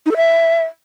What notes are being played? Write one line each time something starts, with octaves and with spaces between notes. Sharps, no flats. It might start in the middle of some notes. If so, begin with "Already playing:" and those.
D#4
A4
E5